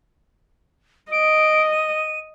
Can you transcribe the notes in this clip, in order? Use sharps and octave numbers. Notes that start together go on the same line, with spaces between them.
D#5 D7
D#7